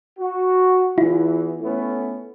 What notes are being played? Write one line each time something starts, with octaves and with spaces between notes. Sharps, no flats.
F#4
E2 E3 E4 F4
A3 B3 C#4